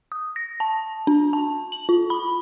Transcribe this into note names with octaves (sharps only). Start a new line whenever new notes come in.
D#6
A#6
A5
D4
A5
F#7
F4
B5